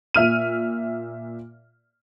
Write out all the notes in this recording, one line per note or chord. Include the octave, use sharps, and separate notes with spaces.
A#2 E5 F6 D#7